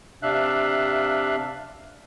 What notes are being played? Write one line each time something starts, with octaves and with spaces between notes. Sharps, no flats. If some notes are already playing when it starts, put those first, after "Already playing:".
C3 D4 E5 F5 F#6